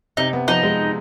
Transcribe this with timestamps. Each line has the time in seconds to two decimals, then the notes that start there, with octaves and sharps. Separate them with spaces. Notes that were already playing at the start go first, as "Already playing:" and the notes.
0.17 C3 D#4
0.33 B3
0.48 F3 D#4
0.63 G#3